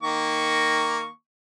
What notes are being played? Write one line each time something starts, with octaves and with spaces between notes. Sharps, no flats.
D#3 A#3 C#6